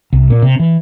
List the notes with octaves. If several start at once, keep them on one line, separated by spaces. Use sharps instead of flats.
C2
A#2
C3
E3